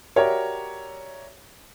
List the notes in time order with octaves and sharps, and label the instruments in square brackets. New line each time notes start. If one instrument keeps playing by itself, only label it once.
[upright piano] F#4 G4 A#4 C#5 D5 E5